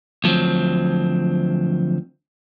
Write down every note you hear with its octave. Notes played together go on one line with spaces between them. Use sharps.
D2 F3 F#3 C4